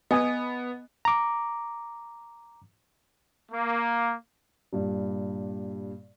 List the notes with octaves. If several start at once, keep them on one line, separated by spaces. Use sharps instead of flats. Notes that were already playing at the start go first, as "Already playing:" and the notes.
B3 D#5 G#5 D#6
A#5 D6
A#3
G2 A#2 G3